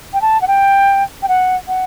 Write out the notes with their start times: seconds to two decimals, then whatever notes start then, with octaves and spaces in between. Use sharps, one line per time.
0.13 G5
0.22 A5
0.42 F#5
0.48 G5
1.23 G5
1.28 F#5
1.68 F#5